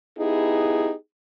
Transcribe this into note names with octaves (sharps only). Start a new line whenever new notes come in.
B3 D#4 E4 G4 G#4